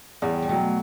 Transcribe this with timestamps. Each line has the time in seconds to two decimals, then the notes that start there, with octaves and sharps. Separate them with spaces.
0.22 E2 G3
0.42 G3
0.48 B2 F#3 A3